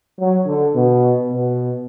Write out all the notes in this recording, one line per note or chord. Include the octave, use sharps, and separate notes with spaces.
F#3
D3
B2
B2